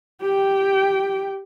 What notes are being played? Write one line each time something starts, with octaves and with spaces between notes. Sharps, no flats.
G4 G5